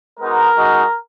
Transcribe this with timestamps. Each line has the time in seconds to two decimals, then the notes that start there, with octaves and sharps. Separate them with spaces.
0.19 G#3 B3 D#4 F#4 A#4
0.56 G#3 D#4 F#4